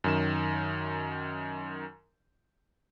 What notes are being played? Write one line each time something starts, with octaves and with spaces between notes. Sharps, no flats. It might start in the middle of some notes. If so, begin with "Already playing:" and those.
F#2 D#3 E7